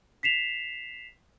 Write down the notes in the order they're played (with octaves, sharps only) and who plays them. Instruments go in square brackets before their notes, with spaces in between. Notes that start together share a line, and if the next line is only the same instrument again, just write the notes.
[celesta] B6 C7 E7 F7